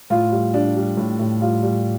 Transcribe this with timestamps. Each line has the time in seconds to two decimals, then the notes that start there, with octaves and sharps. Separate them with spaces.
0.10 A2 F4
0.32 G3
0.53 G3 D4
0.76 G3
0.97 A2
1.19 A2
1.41 G3 F4
1.63 G3